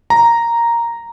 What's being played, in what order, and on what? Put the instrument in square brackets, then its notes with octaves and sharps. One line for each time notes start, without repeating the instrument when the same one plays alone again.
[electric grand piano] A#5